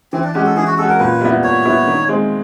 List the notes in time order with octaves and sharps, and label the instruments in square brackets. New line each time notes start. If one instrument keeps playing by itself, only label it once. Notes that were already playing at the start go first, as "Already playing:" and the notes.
[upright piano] E3 [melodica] C4
[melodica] D4
[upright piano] G#3 C#4 F#4 [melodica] G4
[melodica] A4
[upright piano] E3 [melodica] G#4
[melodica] F#4
[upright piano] G#3 [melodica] A4
[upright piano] C#4 F#4
[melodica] A#4
[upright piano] A#2 [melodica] B4
[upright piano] G3 B3 E4
[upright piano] A#2 [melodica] C#5
[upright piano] G3 B3 E4
D#3
G#3 C4